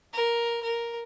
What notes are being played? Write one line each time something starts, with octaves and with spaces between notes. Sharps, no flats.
A#4
A#4